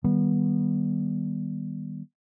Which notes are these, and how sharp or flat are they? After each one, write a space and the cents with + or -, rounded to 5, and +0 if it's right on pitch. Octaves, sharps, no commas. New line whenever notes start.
D#3 +0 G3 +0 B3 -20